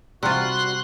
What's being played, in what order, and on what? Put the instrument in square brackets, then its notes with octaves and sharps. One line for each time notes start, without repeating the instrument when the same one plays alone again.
[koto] C3 F4 [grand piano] G3 [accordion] F#4 [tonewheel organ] C6 F#6